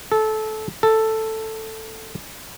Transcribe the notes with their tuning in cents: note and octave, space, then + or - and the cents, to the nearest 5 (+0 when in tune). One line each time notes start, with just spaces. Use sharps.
A4 -20
A4 +5